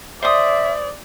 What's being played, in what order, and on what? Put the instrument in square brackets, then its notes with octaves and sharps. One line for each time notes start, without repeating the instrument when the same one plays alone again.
[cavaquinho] C5 D#6 [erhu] D5 [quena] E5